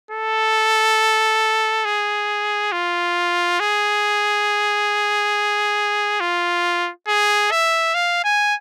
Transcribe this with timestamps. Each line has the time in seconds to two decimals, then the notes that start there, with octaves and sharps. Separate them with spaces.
0.11 A4
1.85 G#4
2.72 F4
3.60 G#4
6.20 F4
7.08 G#4
7.51 E5
7.94 F5
8.24 G#5